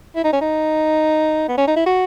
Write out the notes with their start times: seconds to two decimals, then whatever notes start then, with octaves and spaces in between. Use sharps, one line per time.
0.16 E4
0.24 D#4
0.33 C#4
0.41 D#4
1.49 B3
1.58 C#4
1.67 D#4
1.76 E4
1.86 F#4